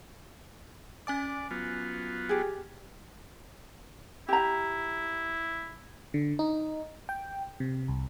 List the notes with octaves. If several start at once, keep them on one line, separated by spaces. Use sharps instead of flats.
C#4 D5 G#5 D6
F#3 B3 F4
G4 G#4
E4 G4 A#5
D3
D#4
G5
C3
C2